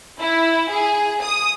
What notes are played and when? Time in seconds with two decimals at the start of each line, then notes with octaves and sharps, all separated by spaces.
0.20 E4
0.71 G#4
1.23 D#6